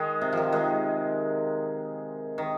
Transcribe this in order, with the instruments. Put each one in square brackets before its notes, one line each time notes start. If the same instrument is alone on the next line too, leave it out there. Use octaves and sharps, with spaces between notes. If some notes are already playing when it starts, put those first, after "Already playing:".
Already playing: [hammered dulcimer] D#3 G#3
C3
D#3 F3
D#3 G#3
D#3